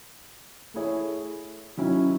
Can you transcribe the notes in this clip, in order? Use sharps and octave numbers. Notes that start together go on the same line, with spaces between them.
A3 E4 G#4 C#5
D#3 F#3 C#4 E4